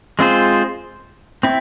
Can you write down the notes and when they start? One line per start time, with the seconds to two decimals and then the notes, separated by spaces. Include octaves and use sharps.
0.19 G#3 C4 F4 G#4 C5
1.43 C4 E4